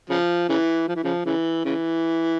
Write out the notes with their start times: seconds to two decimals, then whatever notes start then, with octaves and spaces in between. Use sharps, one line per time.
0.10 C#3 F3
0.49 C#3 E3
0.87 F3
0.95 E3
1.03 C#3 F3
1.26 C#3 E3
1.65 C#3 E3